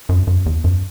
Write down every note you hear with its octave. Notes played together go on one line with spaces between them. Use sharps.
F#2
F#2
E2
F#2